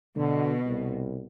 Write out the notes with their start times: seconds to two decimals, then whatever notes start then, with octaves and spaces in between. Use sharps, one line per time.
0.16 B2 D3
0.66 C2